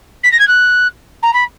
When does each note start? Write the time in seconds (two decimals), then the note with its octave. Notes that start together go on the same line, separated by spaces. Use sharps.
0.23 B6
0.31 A#6
0.39 G#6
0.47 F#6
1.22 A#5
1.33 B5